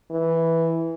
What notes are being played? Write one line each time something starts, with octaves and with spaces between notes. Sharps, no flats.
E3